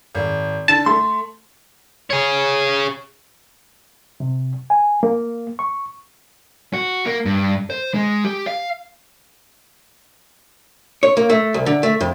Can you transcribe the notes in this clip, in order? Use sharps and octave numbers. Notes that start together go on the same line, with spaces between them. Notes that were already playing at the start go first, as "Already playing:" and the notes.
G#1
D3 A5
A3 C6
G#4 C#5
C3
G#5
A#3
C#6
F#4
A#3
G2
C5
G#3
G4
F5
C#5
A#3
A3
C2
D3
A3
F2